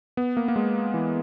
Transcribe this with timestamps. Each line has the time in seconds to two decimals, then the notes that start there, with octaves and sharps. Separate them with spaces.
0.17 B3
0.37 A#3
0.48 A#3
0.56 G#3
0.94 E3